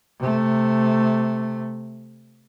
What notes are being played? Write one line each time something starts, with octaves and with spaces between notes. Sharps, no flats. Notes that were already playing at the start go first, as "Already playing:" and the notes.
C3 A3